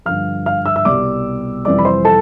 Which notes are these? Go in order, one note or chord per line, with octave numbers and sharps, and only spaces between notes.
G2 D3 F3 F5 F6
F5 F6
E5 E6
E5 E6
C2 B2 G3 D5 D6
F2 C3 E3 G3 D5 D6
B5
C5 C6
A4 A5